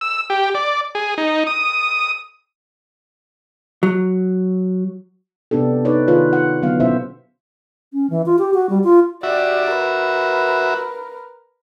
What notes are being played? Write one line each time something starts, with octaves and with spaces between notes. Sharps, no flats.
E6
G4
D5
G#4
D#4
D#6
F#3
C3 B3 D4 G4 A4
D#4 A4 B4 C#5 D5
D#3 F4 G#4 B4 C#5
F#5
D3 F#3 B3 F5
B2 B3 C#4 E4 C5 E5
C#4
E3
F4
G4
F#4
G3
F4
F#4 G4 D5 E5
A#4 B4